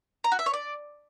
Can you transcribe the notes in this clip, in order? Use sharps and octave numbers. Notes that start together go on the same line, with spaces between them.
A#5
F#4
E5
C#5
D5